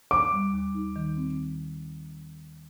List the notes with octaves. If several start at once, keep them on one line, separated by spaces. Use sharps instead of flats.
D#2 D6
G3
D#2
D#4
D#3
C4